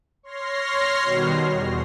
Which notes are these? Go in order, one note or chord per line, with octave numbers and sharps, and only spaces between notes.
C#5 C6 F6 A#6 C7
B2 D#3 G3 F#4
E2